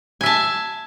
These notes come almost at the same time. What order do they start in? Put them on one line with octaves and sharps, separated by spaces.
G#5 E5 A5